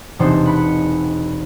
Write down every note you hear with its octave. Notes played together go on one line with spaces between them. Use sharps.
E1 C3 D4 D#4 A4 C5
F#5 B5 C#7